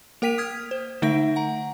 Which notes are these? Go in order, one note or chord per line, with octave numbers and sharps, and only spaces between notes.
A#3 A#4 G5 B6 D#7 F7
D#6 F6 G#6 B6
C5
D3 A3 D#4 E5 A#6 D7
F#5 A#5